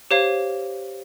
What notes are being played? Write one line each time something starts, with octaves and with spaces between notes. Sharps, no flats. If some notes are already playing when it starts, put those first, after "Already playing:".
G4 C5 C#5 F5